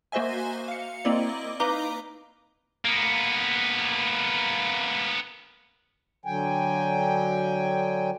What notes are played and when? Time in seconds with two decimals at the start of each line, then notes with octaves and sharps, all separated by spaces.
0.12 A#3 F#4 C5 D#5 E5 G#5
0.68 F5 C#7
1.05 A#3 C4 E4 D5 D#5
1.60 D#4 B4 F5 A#5 D6 G7
2.85 A#3 B3
6.25 D3 F#3 G5 G#5